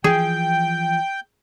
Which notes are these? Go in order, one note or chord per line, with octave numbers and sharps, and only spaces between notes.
E3 F3 G#4 G5